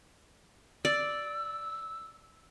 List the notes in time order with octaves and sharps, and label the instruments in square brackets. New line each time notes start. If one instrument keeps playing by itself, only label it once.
[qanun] D5 [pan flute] E6